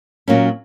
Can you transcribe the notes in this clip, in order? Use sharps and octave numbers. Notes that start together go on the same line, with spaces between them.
A#2 F#3 A#3 C#4